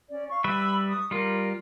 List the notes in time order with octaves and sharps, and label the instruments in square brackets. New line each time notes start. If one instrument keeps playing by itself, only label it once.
[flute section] C#4 D5
F5 C#6
[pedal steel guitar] G3 B4 E5 [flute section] B5 E6
[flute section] C#6 D#6
[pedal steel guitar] G3 F4 [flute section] A#4